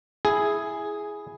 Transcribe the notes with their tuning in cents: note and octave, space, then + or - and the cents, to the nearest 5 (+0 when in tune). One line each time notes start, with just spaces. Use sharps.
E4 +0 G#4 +0